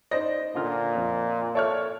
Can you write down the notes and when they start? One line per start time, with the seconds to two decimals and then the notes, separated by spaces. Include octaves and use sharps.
0.11 D#4 C5 D5 D#5 A#6
0.55 A#2 D3 F4 F6
0.95 F2
1.55 A4 C#5 D5 E5 F6